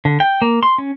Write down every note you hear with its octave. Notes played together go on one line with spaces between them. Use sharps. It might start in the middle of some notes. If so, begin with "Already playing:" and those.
D3
G5
A#3
C6
C#4